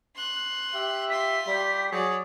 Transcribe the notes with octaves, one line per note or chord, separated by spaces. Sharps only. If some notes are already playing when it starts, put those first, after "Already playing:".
C6 F#6
G4 E5
F4 C6 B6
G3 G4
F#3 G#4 D5